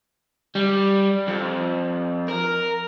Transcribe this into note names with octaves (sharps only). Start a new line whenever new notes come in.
G3
F2
A#4